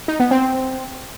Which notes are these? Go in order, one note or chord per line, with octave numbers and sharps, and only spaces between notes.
D#4
B3
C4